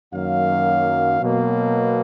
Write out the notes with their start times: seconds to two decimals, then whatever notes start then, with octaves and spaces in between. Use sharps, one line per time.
0.12 F#2 D#3 F#3 A#3 F5
1.20 B2 F#3 A#3